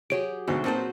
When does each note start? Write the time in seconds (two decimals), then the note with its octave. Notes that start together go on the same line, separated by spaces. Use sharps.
0.10 F#3 G4 G#4 C#5 D7
0.47 D2 G#2 B2 C5
0.64 A#2 C4 F#4 B4 C5 A5